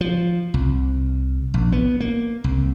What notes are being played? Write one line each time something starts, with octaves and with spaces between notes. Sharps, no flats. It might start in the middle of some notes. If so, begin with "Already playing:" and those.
F3
C2
A#1
B3
A#3
C2